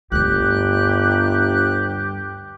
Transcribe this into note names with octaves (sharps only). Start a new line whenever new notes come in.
G1 D2 G2 G4 F#6